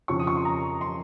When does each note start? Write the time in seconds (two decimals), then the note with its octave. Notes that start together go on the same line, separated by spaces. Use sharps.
0.08 F2 C#3 F3 C#6
0.19 D#6
0.27 C#6
0.36 C6
0.45 A#5
0.81 C6